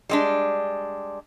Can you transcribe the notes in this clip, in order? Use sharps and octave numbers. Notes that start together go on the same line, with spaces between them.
G3 G#3 D4